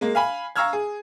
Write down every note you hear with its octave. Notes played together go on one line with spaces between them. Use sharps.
G#3 A#3
F5 G#5 B5
F5 A#5 C#6 E6 F6 G#6
G#4